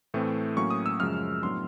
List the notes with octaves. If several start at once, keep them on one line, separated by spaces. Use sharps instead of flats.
A2 E3 A3 C4
A2 F#3 A#3 C#4 C#6
D#6
E6
F#2 C#3 F3 G#3 F6
A2 F#3 B3 D4 C6